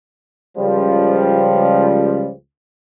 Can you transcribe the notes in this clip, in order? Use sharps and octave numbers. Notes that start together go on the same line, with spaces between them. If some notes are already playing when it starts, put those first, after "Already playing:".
C#2 F3 G3